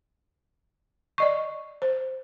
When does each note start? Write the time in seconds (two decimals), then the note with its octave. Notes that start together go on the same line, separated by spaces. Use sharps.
1.18 D5 D#5 C#6
1.82 C5